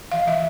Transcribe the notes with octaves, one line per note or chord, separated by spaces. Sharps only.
E3 F5
E3 E5